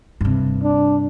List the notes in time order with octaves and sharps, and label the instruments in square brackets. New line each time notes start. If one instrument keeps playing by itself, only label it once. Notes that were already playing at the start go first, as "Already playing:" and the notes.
[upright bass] G2 C3
[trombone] D4